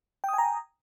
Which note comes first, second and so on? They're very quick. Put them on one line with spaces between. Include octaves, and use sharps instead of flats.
G5 D#6 G#5 A#5